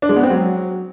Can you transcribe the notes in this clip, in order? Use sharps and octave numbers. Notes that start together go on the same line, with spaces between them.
D4
G#3
B3
C4
F#3